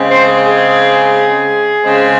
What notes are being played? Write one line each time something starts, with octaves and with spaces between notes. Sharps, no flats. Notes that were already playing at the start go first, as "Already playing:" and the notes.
Already playing: C#3 G#3 C4
C5
G#4
G#4
C#3 G#3 C4